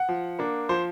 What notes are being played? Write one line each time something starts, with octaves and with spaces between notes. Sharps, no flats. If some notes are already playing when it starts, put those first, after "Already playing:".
Already playing: F#5
F3
A#3 D4
F3 C5